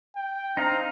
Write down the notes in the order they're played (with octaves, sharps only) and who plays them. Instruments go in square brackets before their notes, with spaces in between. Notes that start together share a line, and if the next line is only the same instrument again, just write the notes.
[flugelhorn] G5
[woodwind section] C4 D4 A#5 [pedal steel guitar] D#4 F5